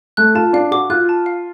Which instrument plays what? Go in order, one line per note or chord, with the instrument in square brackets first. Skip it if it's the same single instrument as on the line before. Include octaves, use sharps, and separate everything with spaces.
[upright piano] A3 [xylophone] F#6
[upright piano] F4 [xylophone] A5
[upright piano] D4 [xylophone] F5
[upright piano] F#4 [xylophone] D6
[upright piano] F4 [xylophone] F#6
[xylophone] A5
F5